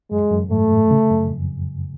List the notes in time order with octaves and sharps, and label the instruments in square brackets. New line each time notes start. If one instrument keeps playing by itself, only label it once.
[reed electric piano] F#2 [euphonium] G#3
[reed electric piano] F#2
[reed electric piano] G#2 [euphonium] A3
[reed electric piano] A2
C#3
F#2
F2